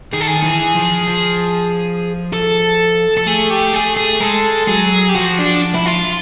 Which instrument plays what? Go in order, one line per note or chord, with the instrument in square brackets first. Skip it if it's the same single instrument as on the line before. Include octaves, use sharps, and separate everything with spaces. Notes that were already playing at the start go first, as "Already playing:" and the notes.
[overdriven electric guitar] D#3 [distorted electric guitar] G#4
[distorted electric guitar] A4
G#4
[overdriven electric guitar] D#3
E3
F3
F3
[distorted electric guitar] A4
A4
[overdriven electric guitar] A3 [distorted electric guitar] G#4
[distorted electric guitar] G4
[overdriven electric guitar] A3 [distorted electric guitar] G#4
[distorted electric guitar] G#4
[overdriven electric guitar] G#3 [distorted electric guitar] A4
[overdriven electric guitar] F#3 [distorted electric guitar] G#4
[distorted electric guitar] G4
[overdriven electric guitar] F3 [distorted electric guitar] F#4
[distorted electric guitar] D4
E4
F4